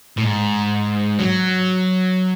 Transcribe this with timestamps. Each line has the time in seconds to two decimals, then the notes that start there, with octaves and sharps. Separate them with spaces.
0.18 A2
0.24 G#2
1.19 F#3